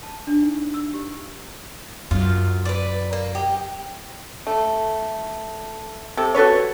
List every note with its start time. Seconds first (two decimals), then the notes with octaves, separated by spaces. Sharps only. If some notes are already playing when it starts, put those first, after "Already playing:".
0.03 A5
0.27 D4
0.43 D#4
0.74 E6
0.94 G4
2.11 F#2 F4
2.65 B4 D5
3.13 A#3
3.35 G4 D#5
4.47 A3
6.17 C3 A4
6.34 F#4 A4 B4 C#5